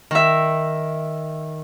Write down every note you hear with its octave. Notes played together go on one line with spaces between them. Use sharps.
D#3 E5